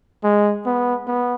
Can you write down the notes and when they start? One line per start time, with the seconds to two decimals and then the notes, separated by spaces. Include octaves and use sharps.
0.24 G#3
0.66 B3
1.07 B3